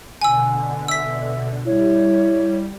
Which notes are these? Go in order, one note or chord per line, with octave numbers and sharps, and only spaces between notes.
B2 D3 G#5 E6
E5 E6 B6
G3 E4 C#5